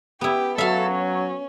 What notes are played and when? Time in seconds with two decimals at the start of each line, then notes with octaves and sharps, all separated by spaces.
0.21 B3 E4 G4
0.58 F#3 A4 E5 F5
0.92 C#4